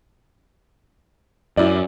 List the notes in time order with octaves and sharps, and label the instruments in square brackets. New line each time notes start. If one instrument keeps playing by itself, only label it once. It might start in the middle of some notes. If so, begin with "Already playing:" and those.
[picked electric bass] F#2 [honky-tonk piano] E4 D5